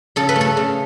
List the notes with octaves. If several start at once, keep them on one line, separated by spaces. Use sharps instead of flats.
C#3 A4
B4
A3
A4
C#3